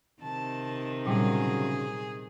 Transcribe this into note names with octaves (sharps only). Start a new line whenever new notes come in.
C3 D#3 A5
A#2 C#3 F#3 G3 G#4